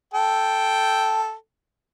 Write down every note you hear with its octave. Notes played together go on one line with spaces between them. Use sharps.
A4 G5